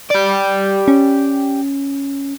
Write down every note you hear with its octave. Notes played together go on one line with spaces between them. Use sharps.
G4 D5
C#4